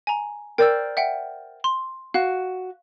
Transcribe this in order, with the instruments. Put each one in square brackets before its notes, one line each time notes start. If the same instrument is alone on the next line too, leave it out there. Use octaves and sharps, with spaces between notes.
[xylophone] G#5 A#5
[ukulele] A#4 C5 D5 [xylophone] G5 E6
[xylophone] E5 F#5 G5
C6
[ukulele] F#4 [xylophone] F5